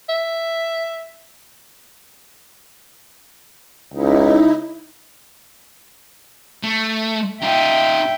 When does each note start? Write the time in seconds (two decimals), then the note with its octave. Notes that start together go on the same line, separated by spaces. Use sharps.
0.09 E5
3.94 C#2 D#4 E4
6.63 A3
7.42 D#4 F4 E5 G5